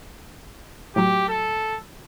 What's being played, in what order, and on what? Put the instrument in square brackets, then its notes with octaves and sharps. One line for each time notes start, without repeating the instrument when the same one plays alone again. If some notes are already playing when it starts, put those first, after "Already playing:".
[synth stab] A2 F#3 [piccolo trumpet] G4
[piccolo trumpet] A4